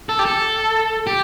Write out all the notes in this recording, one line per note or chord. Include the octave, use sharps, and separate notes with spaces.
A4
G4
A4
G4